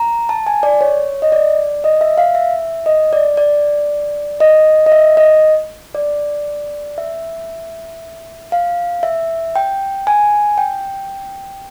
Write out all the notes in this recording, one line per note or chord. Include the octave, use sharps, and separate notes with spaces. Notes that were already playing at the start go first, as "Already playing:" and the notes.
Already playing: A#5
A5
G#5
D5
C#5
D#5
D5
D#5
E5
F5
E5
D#5
D5
D5
D#5
D#5
E5
D#5
D5
E5
F5
E5
G5
G#5
G5